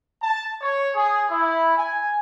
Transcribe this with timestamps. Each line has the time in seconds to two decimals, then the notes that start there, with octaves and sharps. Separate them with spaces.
0.22 A5
0.62 C#5
0.95 G#4
1.30 E4
1.78 G#5